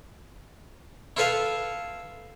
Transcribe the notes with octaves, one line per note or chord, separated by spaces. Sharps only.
E4 F4 A4 B4 E5 F5